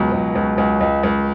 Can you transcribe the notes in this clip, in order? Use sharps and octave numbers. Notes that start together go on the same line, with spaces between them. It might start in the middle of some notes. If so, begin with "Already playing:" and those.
Already playing: C#2 B2 F#3
C#2
C#2
C#2
C#2
C#2